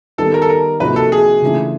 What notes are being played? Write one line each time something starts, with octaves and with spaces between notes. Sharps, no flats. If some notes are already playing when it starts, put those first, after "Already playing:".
D#3 G3 B3 D#4 A4
A#4
A4
A#4
C3 F3 A#3 D#4 F#4 B4
A4
G#4
C#3 E3 A3 D4 F4